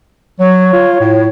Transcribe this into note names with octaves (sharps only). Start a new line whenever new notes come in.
F#3 C#5
F4
A2